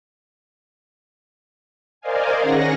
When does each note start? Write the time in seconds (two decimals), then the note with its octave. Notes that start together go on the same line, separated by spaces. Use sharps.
2.01 A#4 C5 D5 D#5 F5 G#5
2.41 D#3 C#4 G#4 F#5 A#6